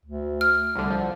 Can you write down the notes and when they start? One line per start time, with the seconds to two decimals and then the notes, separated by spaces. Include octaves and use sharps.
0.06 D2
0.41 F6
0.75 C2 D3 G3
0.90 F3